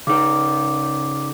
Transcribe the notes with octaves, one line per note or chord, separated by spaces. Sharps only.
C#3 D#4 D6